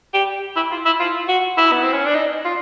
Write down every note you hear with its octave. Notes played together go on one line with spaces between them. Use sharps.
G4
E4
F4
E4
F4
F#4
E4
B3
C4
C#4
D4
D#4
F4